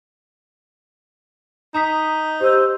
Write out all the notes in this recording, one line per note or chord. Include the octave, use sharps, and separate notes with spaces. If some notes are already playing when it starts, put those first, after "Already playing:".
D#4 A#5 D#6 B6
G4 C5 E6